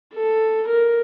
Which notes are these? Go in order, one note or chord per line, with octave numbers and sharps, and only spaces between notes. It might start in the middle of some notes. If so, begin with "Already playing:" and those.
A4
A#4